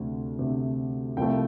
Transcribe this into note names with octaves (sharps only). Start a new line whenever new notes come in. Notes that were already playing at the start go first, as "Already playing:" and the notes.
Already playing: D2 C3 A3
D2 C3 A3
C2 C3 F3 A3 G5